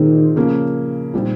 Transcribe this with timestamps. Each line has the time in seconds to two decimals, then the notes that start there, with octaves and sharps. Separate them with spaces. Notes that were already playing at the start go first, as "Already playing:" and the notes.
Already playing: A#2 D#3 G#3 C4 D#4
0.36 C#3 F3 A#3 C#4
1.13 A#2 G3 C4 D#4